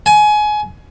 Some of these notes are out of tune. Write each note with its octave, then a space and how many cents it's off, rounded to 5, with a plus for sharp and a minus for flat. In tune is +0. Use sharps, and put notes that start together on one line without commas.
G#5 +25